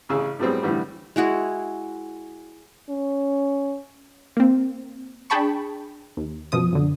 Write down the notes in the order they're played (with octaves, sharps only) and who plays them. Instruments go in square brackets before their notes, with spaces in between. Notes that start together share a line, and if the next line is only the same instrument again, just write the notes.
[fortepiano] A1 C#3 G#4 E6
A2 F#3 G3 B3 C4 G#4
A2 D3 E3 G3
[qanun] G#3 E4 F#4 G#4
[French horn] C#4
[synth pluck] A#3 C4
D4 G#4 G5 A5 B5 C#6
D#2
F#2 B2 F3 D#6
F#2 D3